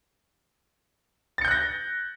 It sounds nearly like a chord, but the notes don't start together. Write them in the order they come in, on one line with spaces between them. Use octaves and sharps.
A6 C#7 G6 F#6 A#6